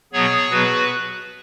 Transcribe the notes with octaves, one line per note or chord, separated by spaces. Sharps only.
B2 F#3 B3 G#4 C#5
B2 F#3 B3 F#4 B4